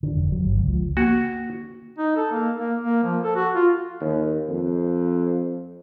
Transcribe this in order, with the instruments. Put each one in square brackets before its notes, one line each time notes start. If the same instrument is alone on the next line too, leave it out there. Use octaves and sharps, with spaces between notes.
[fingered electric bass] D3
F1
F#3
G1
C#2
F3
[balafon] A#3 [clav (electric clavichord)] F#4
[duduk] D#4
A4
A#3
A#3
A#3
F3
A4
F#4
F4
[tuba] D#2
F2